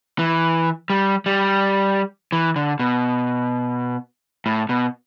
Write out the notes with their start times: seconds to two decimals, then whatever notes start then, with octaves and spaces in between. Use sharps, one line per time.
0.19 E3
0.90 G3
1.26 G3
2.32 E3
2.56 D3
2.79 B2
4.46 A2
4.69 B2